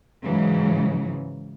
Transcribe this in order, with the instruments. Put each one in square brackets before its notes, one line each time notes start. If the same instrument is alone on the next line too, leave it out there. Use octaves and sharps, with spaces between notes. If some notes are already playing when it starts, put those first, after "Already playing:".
[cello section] G#2 C#3 E3 F#3